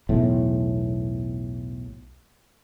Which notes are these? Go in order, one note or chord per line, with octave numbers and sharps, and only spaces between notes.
B1 E2 A2